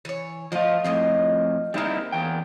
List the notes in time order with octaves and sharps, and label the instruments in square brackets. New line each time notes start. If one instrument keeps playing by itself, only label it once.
[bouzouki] E3 C#5
[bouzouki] A2 D#5 [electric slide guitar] F3 F4
[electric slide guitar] F2 A2 [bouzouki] F4 C5 D#5
[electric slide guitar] G3 D#4 E4 [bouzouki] A#3 C4
[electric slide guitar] E2 G5